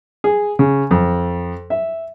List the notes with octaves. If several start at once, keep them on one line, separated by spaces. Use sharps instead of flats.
G#4
C#3
F2
E5